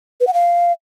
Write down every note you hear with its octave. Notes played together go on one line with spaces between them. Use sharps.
B4
F#5
F5